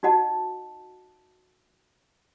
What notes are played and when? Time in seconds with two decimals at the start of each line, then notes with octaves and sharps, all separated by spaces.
0.03 D#4 F#4 D#5 F#5 A5